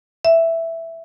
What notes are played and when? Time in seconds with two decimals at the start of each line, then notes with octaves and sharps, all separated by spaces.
0.25 E5